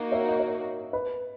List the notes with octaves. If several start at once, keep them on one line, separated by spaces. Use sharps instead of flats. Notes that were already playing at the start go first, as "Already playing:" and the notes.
Already playing: A#3 D#4 F#4
C#5 E5
D#5
C#5
B4